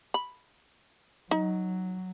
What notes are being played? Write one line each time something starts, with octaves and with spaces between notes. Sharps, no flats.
B5
F#3 D#4